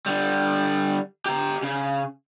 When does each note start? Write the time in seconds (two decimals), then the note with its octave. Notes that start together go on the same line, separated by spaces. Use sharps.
0.06 D3 G3
1.26 G4 A#5
1.63 C#3